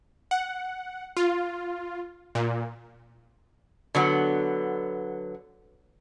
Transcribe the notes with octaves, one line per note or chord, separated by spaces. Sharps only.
F#5
F4
A#2
D3 F#3 B3